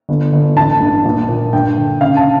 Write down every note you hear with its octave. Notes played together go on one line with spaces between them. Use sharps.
G1
G1
A1 A5
G2
A#1
A#2
G2 G5
D3
C#3 F5
A5